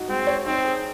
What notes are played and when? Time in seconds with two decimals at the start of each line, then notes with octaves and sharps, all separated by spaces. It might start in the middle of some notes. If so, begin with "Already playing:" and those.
Already playing: D#4 F#4
0.08 G#3 C4
0.27 C#5
0.46 C4 D#4
0.64 G#4